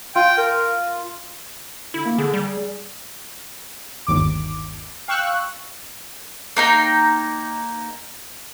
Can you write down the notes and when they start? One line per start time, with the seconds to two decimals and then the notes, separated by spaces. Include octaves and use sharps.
0.15 F4 G5
0.38 A#4
1.94 D3 E4
2.05 A#3
2.18 D3 G#4
2.34 G3
4.07 G1 D#2 D6
5.08 F5 G5 C#6 E6 F#6
6.57 A#3 D#4 G5